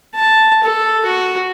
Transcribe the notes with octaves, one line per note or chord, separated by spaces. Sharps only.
A5
A4
F#4